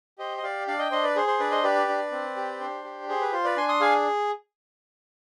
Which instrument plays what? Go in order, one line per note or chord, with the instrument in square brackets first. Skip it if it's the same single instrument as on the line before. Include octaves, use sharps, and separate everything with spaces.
[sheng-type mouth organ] G4 C5 D#5
D#5
G4 D5 F5
D4 D5 F5
D#5 G5
D4 C5 D#5
B4 D5
G#4 C5
C5
D4 B4 D5
C5 D#5
G4 B4 D5
D4
C4
G4
D4 C5
G4
G#4 C5
B4
F4 C5
B4 D5
D4 G#5 C6
C6 D#6
G#4 F5 G#5